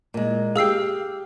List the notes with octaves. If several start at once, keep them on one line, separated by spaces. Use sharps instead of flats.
A#2 G#3
G4 G#4 F5 E6 C7